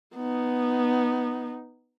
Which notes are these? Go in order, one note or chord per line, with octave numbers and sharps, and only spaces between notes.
B3 D#4